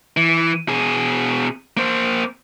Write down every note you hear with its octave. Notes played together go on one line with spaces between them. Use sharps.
E3
B2 G#4
A#3 C5